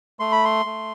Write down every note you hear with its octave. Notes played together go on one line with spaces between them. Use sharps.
A3 C6
B5
C6
A3